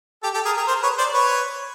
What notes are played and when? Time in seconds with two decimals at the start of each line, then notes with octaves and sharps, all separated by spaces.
0.23 G4 A4
0.34 G4 A4
0.45 G#4 A#4
0.57 G#4 A#4
0.68 A#4 C5
0.83 B4 C#5
0.98 C5 D5
1.13 B4 C#5